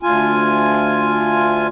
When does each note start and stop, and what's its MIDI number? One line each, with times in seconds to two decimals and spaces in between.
0.03 1.67 38
0.03 1.67 65
0.03 1.67 80